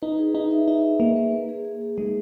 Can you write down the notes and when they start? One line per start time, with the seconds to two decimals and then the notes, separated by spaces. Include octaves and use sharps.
0.02 D#4 B4
0.18 G#4
0.35 D#4 B4
0.51 E5
0.68 D#4 E5
0.84 G#4
1.00 A#3 E5
1.16 B4
1.32 A#3
1.49 G#4
1.65 G#4
1.81 G#4
1.97 G#3 D#4